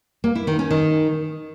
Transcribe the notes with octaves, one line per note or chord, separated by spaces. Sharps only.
A#3
E4
D#3
C#4
D#3